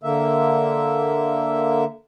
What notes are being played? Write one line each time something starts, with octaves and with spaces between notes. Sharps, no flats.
D3 A#3 E5